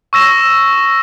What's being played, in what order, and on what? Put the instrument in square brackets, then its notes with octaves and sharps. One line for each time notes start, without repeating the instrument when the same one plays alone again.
[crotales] C#6 E6 A#6 E7